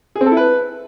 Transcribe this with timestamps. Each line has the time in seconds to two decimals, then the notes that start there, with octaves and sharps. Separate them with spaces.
0.16 G#4
0.21 C4
0.26 A4
0.31 E4
0.37 B4